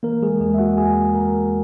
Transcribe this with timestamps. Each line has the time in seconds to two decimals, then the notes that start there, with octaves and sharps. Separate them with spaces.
0.03 E3 A#3 A#4
0.23 G#3 G#4
0.40 E2 G#3 G#4
0.54 E5
0.59 F#4 F#5
0.77 E2 G#4 G#5
1.14 E2 A#4 A#5